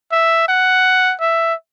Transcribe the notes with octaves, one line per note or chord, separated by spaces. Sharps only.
E5
F#5
E5